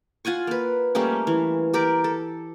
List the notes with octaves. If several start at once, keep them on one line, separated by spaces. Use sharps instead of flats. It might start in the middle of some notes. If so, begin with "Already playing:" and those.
F4 F#5 G#5 C#6
A#3 B4
G3 A3 A#3 C#4
E3
G4 A#4 D5
A4